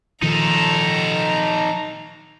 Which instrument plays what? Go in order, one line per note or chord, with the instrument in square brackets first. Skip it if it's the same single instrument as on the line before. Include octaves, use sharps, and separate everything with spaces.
[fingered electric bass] A#2 D#3 F3 [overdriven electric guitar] D#4 A4 [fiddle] A#5